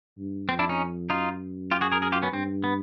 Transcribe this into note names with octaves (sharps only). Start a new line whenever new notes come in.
G2
F2 C4
D4 E4
C#4 D#4
F#2 D#4 F4
F4 G4
F#4 G#4
G#4 A#4
G#4 A#4
F4 G4
B3 C#4
G2 C4
B3